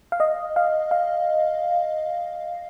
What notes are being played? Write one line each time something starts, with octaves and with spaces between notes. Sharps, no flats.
F5
D#5
F5
F5